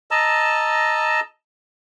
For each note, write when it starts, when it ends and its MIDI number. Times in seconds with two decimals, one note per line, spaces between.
0.11 1.20 75
0.11 1.20 81
0.11 1.20 82
0.11 1.20 88